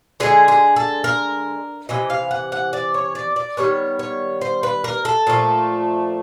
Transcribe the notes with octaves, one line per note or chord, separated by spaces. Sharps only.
D3 F3 G#3 G#4
G#4
A4
A#4
C3 E3 D#5
F5
F#5
F#5
D5
C#5
D5
D5
D#3 G3 B3 C#5
C#5
C5
B4
A#4
A4
A#2 F3 A3